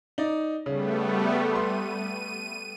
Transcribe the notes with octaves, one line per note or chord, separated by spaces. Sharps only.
D#4 D5
C#3 G3 A3 B3
C6 D#7